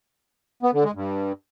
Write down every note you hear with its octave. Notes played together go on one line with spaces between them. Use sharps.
B3
D3
G#3
G2